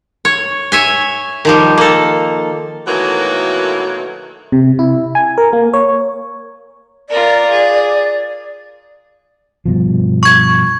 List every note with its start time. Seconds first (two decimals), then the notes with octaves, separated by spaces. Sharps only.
0.25 C#5
0.72 C#5 E5 G#5
1.45 D#3 F3 G3
1.78 A#3 A4
2.87 B2 D#3 E3 F#3 A3 A#3
4.52 C3
4.79 E4
5.15 G#5
5.38 A#4
5.53 A#3
5.73 C#5
7.10 F4 A#4 D5
7.50 G#4
9.65 G2 B2 F3
10.23 C#6 G#6